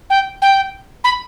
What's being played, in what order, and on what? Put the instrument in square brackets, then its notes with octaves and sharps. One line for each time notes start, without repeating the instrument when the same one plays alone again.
[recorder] G5
G5
B5